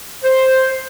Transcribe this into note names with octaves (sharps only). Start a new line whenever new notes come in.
C5